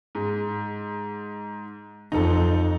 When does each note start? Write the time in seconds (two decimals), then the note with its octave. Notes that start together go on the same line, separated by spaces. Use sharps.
0.15 G#2
2.12 F2 D#4 A4